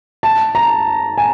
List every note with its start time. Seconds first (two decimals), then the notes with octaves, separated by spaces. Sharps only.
0.23 A5
0.55 A#5
1.18 G#5